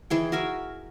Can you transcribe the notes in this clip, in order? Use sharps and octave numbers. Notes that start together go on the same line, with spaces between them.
D#3 E3 G#4 G5
F#4 A#4 E5 G#5